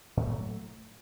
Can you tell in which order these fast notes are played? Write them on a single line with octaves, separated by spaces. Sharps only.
A2 B3 A3 F#3